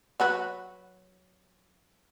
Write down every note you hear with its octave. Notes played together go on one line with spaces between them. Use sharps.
F#3 F#4 B4